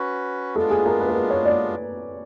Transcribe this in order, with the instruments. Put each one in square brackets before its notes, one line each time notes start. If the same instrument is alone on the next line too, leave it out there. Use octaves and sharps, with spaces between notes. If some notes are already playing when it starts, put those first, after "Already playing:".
Already playing: [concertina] C#4 F#4 B4
[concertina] G#3 B3 D4 F4 [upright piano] A4
[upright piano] G#4
A#4
B4
A#4
B4
C#5
D5